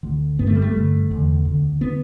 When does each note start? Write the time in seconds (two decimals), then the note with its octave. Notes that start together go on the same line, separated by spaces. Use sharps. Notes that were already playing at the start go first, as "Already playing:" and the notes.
0.03 D2 D3
0.39 G2 B3
0.43 D3 A3
0.55 G3
0.62 A3
0.75 G2 D3
1.10 E2 D3
1.45 D2 D3
1.81 D3 B3